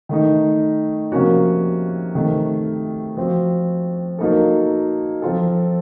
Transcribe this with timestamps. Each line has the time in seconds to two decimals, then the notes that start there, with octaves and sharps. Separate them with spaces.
0.09 D#3 A3 D#4
1.12 C3 F3 A#3 C#4 F#4
2.15 C3 D#3 A3
3.17 F3 C4 F#4
4.19 F#3 A#3 D#4 A4
5.22 F3 C4 F4 A4